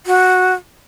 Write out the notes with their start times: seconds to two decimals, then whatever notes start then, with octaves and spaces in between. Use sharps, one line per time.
0.07 F#4